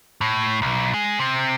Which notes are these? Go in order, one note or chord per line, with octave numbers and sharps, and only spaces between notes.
A2
B1
G#3
C3